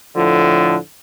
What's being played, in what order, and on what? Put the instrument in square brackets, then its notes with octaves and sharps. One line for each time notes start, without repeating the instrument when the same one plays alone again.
[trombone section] A2 D3 F3